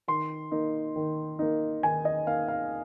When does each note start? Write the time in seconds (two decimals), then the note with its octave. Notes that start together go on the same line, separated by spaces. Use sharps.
0.08 D#3 C6
0.51 A#3 D#4
0.96 D#3
1.39 A#3 D#4
1.83 D#3 G#5
2.05 D#5
2.27 A#3 D#4 F5
2.48 F5